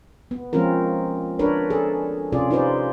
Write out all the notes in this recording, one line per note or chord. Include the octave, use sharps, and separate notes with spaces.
B3
F3 G#3 C4 C#4 F4 A#4
D4 A#4 B4 C#5
G#4 A4
C3 C#4 F4 G#4 D5
D#4 F4 B4 C5 D5